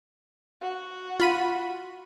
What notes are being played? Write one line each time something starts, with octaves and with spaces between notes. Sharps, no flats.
F#4
F4 B5 D#7